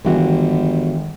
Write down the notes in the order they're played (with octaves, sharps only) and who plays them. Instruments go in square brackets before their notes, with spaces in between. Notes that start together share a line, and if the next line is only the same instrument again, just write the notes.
[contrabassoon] G1 [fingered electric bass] D#3 G3 G#3 [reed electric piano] E3 F#4